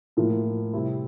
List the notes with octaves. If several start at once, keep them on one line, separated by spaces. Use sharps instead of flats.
A2 F3 A#3 F4
C3 G3 C4 E4